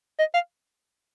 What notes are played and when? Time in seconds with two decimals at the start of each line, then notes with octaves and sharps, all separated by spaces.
0.19 D#5
0.34 F5